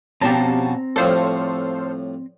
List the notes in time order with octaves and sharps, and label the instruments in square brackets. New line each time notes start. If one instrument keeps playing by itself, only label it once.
[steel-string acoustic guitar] F2 B2 C#4 [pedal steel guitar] C4 A#5 [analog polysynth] G4 A5
[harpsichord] A2 F3 G3 [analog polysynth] A4 C5 F5 [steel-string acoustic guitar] C#5